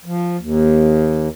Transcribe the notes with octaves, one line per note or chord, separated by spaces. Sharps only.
F3
D#2